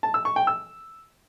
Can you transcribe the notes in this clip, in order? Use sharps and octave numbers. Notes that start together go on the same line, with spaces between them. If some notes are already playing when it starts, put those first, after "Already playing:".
A5
E6
C#6
G5
E6